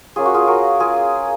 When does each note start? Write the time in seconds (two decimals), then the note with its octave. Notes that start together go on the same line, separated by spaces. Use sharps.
0.16 A#3 C#4 F4 G#4
0.25 F#4
0.34 F4 G#4
0.47 F#4 A#4
0.80 F4 G#4